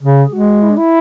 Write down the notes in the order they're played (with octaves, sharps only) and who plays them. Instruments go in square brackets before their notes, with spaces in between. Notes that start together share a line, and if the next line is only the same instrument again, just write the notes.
[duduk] C#3 [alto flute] G#4
[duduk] G#3 [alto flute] F#4
[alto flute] E4
D4
E4